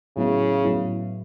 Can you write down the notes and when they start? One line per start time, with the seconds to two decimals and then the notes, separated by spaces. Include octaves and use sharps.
0.17 A2 C#3 F#3 B3 E4
0.64 A2 F#3 B3 E4